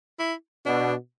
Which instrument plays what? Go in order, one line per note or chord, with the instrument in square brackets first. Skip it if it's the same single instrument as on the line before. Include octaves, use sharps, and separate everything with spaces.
[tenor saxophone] E4
[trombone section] B2 [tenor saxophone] D4